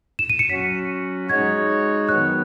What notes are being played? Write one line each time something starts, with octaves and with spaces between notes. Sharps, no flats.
E7
D#7
C#7
F#3 C#4 F#4 B6
G#3 D#4 F#4 C#5 G#6
D#3 F#3 B3 F#6